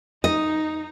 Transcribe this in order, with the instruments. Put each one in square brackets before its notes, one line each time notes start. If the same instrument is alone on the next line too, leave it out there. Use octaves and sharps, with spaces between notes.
[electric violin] D#4 [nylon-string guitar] D#5